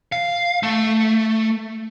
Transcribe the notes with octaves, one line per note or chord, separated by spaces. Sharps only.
F5
A3